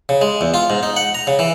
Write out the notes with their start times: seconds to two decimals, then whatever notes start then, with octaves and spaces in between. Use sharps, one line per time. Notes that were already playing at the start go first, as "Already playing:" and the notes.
0.09 C#3
0.21 G#3
0.41 E2
0.54 F4
0.70 G#2
0.83 D#4
0.96 F#5
1.15 A#5
1.27 C#3
1.39 E3